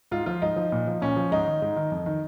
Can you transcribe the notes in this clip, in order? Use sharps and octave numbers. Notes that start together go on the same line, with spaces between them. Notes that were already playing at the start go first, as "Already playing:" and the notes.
G#2 F4
F3 F4
G#2 D#4
F3
A#2
F3
A#2 C#4
F3
G#2 D#4
D#3
G#2
D#3
F2
D#3